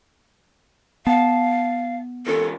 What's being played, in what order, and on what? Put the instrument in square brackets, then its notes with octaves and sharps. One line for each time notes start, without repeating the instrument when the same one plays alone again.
[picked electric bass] B3 [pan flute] F5 [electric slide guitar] A5
[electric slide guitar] C#4 F4 A#4 [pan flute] A4